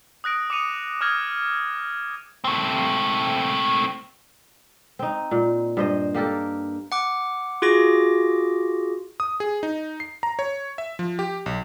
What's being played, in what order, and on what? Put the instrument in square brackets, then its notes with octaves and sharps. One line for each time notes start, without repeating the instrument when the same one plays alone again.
[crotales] D#6 F#6 A#6 D7
D6 D#6 C#7 D#7 F7
D6 D#6 F6 F#6 G#6 A#6
[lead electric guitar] A3 C4
[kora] C4 D#4
A#2
G2 C5 D#5
A#3 G4 A4 A#4
[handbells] F#5 D6
F4 F#4 G#4 D6 A#6
[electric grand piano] D#6
G#4
D#4
C7
A#5
C#5
E5
F3
G4
B1